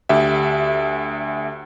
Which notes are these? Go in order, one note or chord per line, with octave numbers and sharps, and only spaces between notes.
D2 G4 E5